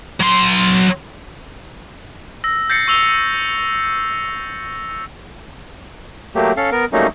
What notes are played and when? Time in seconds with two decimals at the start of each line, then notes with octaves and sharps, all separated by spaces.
0.20 F#3 C6
2.44 E6 A#6
2.70 G6 A6 A#6 C7 C#7
2.88 C#6 E6 F7 G7
6.35 F#3 A3 A#3 G4
6.57 C#4 A4 F5
6.72 B3 A#4
6.93 F#3 G3 A3 A#3 C#4 D#4